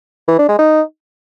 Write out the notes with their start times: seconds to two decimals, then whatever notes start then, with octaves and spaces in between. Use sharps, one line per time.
0.28 E3
0.38 D4
0.49 G#3
0.59 D#4